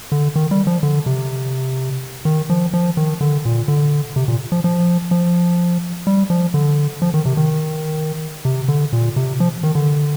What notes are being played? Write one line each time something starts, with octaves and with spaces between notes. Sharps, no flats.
D3
D#3
G3
F3
D3
C3
D#3
F3
F3
D#3
D3
A#2
D3
C3
A#2
F3
F3
F3
G3
F3
D3
F3
D#3
C3
D#3
C3
D3
A#2
C3
F3
D#3
D3